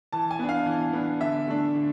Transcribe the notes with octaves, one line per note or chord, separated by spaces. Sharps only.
E3 A5
G#5
B3 D4
F5
E3
B3 D4
D3 E5
A3 D4
D3